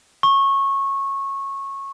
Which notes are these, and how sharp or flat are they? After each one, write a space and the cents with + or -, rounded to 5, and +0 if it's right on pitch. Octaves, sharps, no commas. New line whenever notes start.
C#6 -15